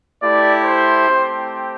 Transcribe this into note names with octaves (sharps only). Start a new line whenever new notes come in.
A3 E4 G4 D5
C5
A3 C4 G4